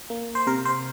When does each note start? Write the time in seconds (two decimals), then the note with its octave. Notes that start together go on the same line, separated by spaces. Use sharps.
0.10 A#3
0.35 C5
0.47 C3 A#4
0.65 C5